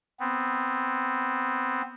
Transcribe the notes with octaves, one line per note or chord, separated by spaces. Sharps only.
B3 C4